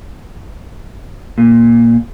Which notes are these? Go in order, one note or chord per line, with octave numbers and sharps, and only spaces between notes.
A#2